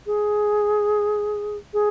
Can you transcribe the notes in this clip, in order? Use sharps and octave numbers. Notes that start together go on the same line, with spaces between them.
G#4
G#4